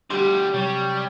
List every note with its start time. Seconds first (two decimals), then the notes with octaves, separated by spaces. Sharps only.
0.10 D2 G3 G4 C6
0.54 C3 F#3 G3 C#5